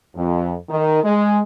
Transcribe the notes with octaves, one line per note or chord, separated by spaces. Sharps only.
F2
D#3
G#3